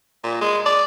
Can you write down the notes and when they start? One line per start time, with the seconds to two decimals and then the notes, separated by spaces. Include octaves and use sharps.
0.23 A#2
0.41 G#3
0.66 D5